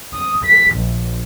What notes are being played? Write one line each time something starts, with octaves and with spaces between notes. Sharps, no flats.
D#6
B6
A#1